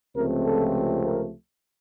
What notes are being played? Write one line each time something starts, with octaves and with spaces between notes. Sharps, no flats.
C#2 C3 F3 A3 C4 A#4
A4
A#4